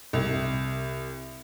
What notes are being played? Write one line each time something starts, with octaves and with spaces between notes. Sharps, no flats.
C2